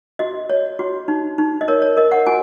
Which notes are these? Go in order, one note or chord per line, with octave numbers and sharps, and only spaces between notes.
F#4 D#5
C#5
F#4
D#4
D#4
D#5
A#4 C#5
C#5
A#4 D#5
F#5
F#4 G#5